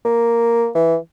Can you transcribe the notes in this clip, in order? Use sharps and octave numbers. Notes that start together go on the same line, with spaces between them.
A#3
E3